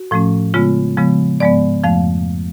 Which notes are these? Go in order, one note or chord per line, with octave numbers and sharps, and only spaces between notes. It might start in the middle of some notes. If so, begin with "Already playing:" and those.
Already playing: F#4
A2 F3 A3 C#4
C#3 G#3 B3 F4
C#3 F3 G#3 B3
G#2 F3 G#3 B3 D5
F2 F3 A3 F5